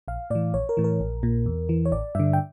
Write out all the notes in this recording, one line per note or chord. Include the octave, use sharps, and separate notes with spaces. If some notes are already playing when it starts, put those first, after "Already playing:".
A#1 F5
A2 E3 D5
A#1 C#5
A#4
A2 E3
A#4
A#1
A#2
E2
E3
C#5
A1 D5
G2 D3 E5
G5